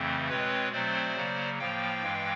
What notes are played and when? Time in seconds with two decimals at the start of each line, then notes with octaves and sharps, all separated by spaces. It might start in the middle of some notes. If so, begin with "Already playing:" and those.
Already playing: F2 C#3 E3 A3 C4
0.29 B2 G#3 C4 B4 C#5
0.72 B2 F#3 A3 C4 C5 D5
1.15 C#3 F#3 A#3
1.59 A2 F3 A#3 F5 G5
2.02 G2 E3 G#3